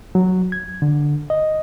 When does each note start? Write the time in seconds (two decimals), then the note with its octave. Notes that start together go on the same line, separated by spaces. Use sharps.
0.15 F#3
0.52 G#6
0.82 D3
1.30 D#5